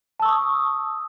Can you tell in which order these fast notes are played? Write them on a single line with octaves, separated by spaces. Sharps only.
A5 E6 C#6 D#6